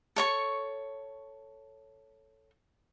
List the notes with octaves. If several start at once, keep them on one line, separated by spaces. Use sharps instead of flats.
A4 C#5 C#6